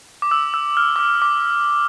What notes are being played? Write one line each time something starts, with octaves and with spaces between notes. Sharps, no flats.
D6
E6
E6
F6
D6
E6
D6